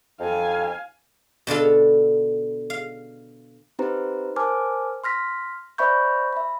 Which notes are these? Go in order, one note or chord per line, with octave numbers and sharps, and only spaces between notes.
F2 F5 G#5
B2 D3 F4 A4
F5
C4 D#4 G4 B4 C5 A#5
A#4 C5 G#5 A5 D6 F6
C6 F6 A#6 B6
C5 D5 E5 B5 C#6 G6
E5 B5